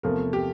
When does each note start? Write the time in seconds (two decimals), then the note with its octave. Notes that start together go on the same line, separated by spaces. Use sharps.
0.03 E2 C3 F3 A3 A#4
0.33 G4